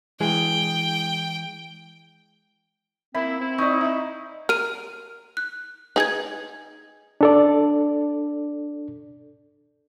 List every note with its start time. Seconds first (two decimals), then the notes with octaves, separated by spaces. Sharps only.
0.20 E3 G#3 G#4 G5
3.15 A#3 C4 E4 E5 B5
3.40 C4 E4
3.58 D#4 D5 C#6
3.81 D#5 E5
4.49 A#4 F6 D#7
5.37 F#6
5.96 D#4 G#4 B4 G#6
7.21 D4 A4 D5